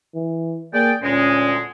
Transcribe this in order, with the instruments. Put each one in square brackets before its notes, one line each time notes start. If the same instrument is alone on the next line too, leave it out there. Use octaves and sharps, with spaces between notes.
[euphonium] E3
[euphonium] A#3 [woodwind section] G#4 D5 G5
[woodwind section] D2 A#2 G#3 [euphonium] C#4